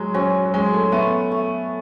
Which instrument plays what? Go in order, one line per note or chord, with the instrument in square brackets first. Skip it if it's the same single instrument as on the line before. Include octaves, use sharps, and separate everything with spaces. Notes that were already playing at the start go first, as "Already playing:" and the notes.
Already playing: [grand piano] F#3 G#3
[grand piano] F#3 [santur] C#4
[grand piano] F#3
[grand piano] G#3 [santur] C#4
[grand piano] A3
[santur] A3 [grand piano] B3
[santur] A3